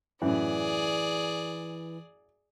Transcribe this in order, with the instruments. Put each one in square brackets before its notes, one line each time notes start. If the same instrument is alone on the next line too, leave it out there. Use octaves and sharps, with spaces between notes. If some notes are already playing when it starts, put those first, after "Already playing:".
[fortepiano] F#2 A2 [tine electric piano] E3 [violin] G#4 D5